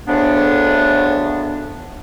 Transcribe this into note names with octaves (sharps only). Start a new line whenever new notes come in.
D2 A2 C#3 B3 D4